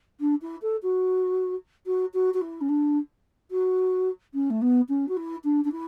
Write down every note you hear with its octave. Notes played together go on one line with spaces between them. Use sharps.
D4
E4
A4
F#4
F#4
F#4
F#4
E4
C#4
D4
F#4
C#4
A3
B3
C#4
F#4
E4
D4
D4
E4